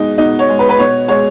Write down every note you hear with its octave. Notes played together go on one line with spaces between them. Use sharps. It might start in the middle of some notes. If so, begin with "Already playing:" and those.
Already playing: B2 G#3 D#4
B2 D#4
C#5
G#3
B4
B4
B2 C#5
G#3 C#5